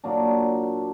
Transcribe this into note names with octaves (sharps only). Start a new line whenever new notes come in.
A#2 F#3 A#3 D4